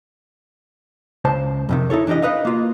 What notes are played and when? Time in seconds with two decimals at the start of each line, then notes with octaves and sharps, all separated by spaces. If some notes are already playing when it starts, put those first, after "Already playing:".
1.25 C#2 C5 A5
1.69 F2 C3 D#3
1.90 D#4 E4 A4 C#5
2.07 E3 D4 D#4 G4 D#5
2.22 D#4 B4 D#5 F5
2.45 A#3 F4